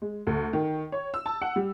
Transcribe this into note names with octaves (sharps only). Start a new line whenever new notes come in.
G#3
D2
D#3
C#5
E6
A5
F#5
G3